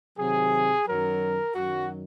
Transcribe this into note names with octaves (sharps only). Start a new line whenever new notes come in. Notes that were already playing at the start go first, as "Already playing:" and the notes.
C3 D#3 F#3 G#4
F#2 D#3 F#3 A#4
F#2 D#3 F#3 F#4